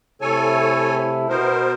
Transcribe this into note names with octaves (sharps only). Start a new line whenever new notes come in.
C3 A3 E4 A4 C#5 G#5
B2 B3 A#4 C5